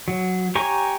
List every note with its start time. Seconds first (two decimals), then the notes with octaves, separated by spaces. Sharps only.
0.08 F#3
0.55 G4 C#5 G#5 A#5 C#6